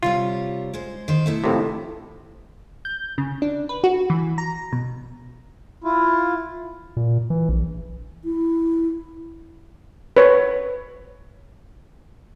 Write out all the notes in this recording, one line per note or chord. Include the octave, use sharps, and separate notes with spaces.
C3 G3 F4 C#5
G#3 C5
D#3 C5
B2 A3 E4
F2 A2 C3
G6
C#3
D4
B4
F#4
E3
A#5
B2
E4 F4
A#2
E3
A#1
E4
B4 C#5